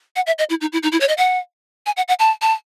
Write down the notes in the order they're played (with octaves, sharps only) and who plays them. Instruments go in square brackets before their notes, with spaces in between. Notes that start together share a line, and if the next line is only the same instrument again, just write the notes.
[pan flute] F#5
E5
D#5
E4
D#4
E4
D#4
E4
C#5
D#5
F#5
G#5
F#5
F#5
A5
A5